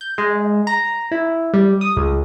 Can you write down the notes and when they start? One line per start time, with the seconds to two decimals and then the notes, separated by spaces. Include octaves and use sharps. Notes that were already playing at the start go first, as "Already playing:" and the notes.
0.01 G6
0.18 G#3
0.67 A#5
1.11 E4
1.54 G3
1.81 D#6
1.97 C#2